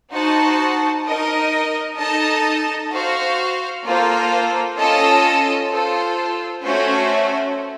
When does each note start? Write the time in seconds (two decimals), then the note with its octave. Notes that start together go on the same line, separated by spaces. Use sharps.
0.13 D#4 F#4 C5 F#5 A5
1.06 D#4 A#4 D#5
1.98 D#4 A4 D#5 A5
2.91 F#4 C5 F5
3.84 A#3 F4 A4 C5
4.77 C#4 F4 A4 D#5 A5
5.69 F4 A4 C5
6.62 A3 C#4 F#4 C5